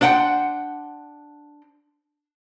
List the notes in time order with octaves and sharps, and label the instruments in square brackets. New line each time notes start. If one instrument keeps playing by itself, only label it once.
[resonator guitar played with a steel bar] D4 C5 F#5 G5